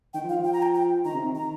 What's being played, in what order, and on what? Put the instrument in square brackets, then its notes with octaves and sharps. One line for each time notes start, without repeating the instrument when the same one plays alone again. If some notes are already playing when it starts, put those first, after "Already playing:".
[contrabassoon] D#3 [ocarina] G5
[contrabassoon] F3
[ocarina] F5
[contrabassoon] F3
[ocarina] G5
A#5
G5
G5
[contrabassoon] D#3 [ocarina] A#5
[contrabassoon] C3
D#3
[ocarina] A#5